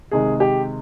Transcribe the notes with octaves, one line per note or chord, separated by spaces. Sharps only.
C3 D#3 G#3 G#4
G4